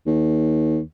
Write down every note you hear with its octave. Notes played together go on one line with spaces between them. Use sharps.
D#2